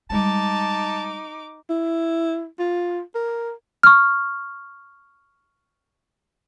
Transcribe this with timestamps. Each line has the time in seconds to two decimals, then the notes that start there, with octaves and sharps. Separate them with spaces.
0.10 G3 G#3 D#4 A5 D6
1.70 E4
2.59 F4
3.15 A#4
3.83 C#6 F6